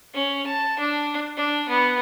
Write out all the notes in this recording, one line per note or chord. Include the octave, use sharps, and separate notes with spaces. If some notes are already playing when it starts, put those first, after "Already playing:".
C#4
A5
D4
D4
B3